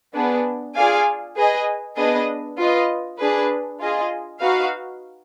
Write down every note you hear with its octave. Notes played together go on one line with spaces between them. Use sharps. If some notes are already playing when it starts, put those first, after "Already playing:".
B3 D4 G#4
F4 G#4 D5 F5 G#5
G#4 B4 D#5 G#5
B3 D4 G#4 B4 D#5
F4 B4 D#5
D4 G#4 B4
F4 G#4 D#5
D#4 F#4 B4 F5